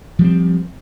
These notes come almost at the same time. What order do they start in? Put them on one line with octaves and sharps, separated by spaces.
F3 G3 C4